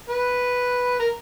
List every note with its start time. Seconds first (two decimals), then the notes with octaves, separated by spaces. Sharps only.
0.09 B4
0.99 A#4